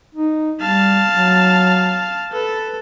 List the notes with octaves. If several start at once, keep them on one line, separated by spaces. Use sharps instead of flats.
D#4
G3 F5 A5
F#3
A4 B4